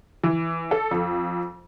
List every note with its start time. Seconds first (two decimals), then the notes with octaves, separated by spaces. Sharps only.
0.23 E3
0.71 A4
0.91 F2